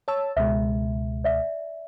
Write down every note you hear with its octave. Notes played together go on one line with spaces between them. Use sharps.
C#5 A5 E6
C#2 B2 G#3 E5
D5 E5